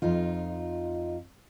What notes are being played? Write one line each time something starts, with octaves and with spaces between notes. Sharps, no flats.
F2 D#4 F4